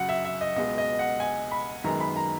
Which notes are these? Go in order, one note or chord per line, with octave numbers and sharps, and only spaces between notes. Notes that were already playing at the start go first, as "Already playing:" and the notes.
Already playing: F#2 C#3 F#3 F#5
E5
E5
D#5
C#2 B2 G#3 D#5
D#5
F#5
G#5
B5
F#2 D#3 G#3 B3 A#5
B5
A#5